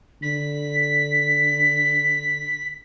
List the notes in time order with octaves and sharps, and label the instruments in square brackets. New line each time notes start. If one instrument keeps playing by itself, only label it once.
[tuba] D3 [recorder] B6